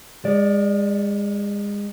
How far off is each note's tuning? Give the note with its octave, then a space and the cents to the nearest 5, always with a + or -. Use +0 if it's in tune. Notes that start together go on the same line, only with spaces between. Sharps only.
G#3 -30 D5 +0